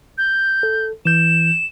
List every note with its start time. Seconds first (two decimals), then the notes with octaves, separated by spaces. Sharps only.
0.18 G6
0.63 A4
1.06 E3 G6 E7